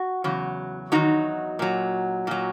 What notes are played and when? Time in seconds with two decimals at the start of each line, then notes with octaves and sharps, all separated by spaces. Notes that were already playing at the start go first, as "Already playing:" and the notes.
Already playing: F#4
0.24 E2 C#3 F#3
0.92 E2 D#3 F#3 D#4 F#4
1.59 A#2 F#3
2.27 A#2 F#3